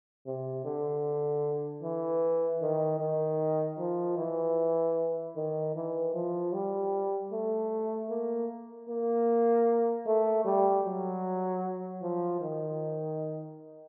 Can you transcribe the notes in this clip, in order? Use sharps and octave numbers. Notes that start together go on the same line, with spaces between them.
C3
D3
E3
D#3
D#3
F3
E3
D#3
E3
F3
G3
A3
A#3
A#3
A3
G3
F#3
F3
D#3